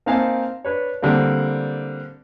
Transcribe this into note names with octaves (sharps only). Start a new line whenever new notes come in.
A#3 C4 D#4 F5 G#5 A5
D4 B4 C#5
D3 G3 A#3 C4